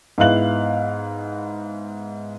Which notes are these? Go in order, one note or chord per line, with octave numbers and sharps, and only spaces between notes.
G#2 B3 E4 F5 F#6 F#7